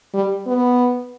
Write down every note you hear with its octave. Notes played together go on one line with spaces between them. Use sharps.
G3
B3